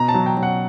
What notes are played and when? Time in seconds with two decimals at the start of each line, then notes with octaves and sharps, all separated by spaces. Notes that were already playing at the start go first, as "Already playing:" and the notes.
Already playing: B2 A#5
0.08 A5
0.14 F#3
0.26 G5
0.37 F#3
0.43 F#5